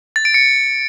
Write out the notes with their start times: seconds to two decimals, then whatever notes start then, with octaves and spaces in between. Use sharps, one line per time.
0.16 A6
0.25 D7
0.34 C#7